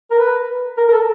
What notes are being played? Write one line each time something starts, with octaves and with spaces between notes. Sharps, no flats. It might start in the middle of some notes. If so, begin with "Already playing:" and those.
A#4
B4
A#4
A#4
A4